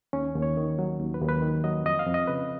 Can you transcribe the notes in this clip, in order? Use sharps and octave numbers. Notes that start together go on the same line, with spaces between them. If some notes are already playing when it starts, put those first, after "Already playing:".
D#2 C#4
D#2
C#5
D#3
F#3
D#2
B4
D#2
B4
D#3
F#3 D#5
F2 D#5
F5
F2
D#5
C#3 B4